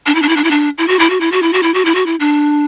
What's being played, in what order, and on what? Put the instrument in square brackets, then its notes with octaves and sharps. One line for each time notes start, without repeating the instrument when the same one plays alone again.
[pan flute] D4
E4
D4
E4
D4
E4
D4
E4
F#4
E4
F#4
E4
F#4
E4
F#4
E4
F#4
E4
F#4
E4
D4